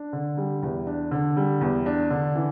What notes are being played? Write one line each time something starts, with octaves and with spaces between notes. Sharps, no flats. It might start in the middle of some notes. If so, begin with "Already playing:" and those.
Already playing: D4
D3
G3
E2
D4
D3
G3
E2
D4
D3
E3